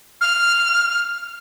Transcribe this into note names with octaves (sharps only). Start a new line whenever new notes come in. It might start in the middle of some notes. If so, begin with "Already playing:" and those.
F6